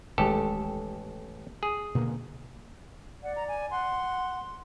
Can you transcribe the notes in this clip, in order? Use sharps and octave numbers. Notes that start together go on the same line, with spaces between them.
D1 A1 D#3 G#3 G4 A4
G#4
B2 D3 A#3
D5 F#5
A#5
G#5
F#5 C6